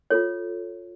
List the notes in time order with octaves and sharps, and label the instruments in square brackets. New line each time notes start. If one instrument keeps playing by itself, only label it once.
[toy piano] F4 A4 C#5